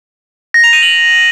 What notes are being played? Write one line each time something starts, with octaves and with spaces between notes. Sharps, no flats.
A#6
F7
D#7
F#7